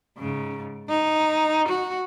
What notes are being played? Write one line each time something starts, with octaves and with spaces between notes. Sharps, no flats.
G#2 C#3
D#4
F#4